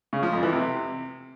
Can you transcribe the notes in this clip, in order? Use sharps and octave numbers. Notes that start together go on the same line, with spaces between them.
C#3
F3
F2
E3
C3